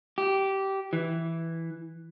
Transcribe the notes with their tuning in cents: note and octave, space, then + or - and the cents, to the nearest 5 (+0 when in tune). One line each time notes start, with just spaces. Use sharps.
G4 -15
E3 +0